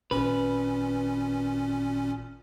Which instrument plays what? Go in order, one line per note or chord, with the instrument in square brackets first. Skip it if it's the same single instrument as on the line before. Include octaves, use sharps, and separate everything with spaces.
[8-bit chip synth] G#1 A#2 C#4 [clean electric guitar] B4